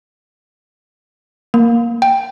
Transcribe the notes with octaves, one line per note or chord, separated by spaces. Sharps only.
A#3
G5